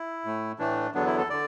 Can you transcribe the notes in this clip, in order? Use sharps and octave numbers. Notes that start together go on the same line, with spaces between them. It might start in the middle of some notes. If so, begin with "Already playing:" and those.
Already playing: E4
A2 A3
A2 E3 A3 D4
E2 D3 F#3 B3 D4
E4
A4
D3 D5